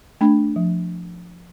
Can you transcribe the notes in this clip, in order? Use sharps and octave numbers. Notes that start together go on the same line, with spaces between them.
A3 D4
F3